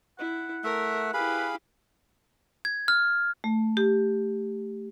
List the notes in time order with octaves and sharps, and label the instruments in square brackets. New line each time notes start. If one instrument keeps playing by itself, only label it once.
[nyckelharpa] E4 [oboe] F#5
[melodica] A3 E5 [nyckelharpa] A#4
[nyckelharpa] E4 G4 [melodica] G#4 F5 B5 [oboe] B4
[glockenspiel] G#6
F6
[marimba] A3
G4